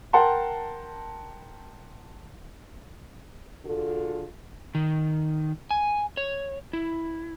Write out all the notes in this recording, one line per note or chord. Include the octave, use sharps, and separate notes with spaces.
A#4 F#5 G5 A5 C6
D3 F4 F#4 G#4 A4
D#3
G#5
C#5
E4